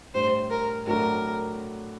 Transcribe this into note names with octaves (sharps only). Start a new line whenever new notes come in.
A2 G3 D4 C5
A#4
A2 F#3 A3 D4 F#4 A#4